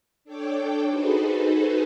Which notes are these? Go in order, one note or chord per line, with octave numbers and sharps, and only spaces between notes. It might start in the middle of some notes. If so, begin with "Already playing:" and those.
D4 A4 C#5 G5 D6
D#4 F#4 G#4 A4 B4 C5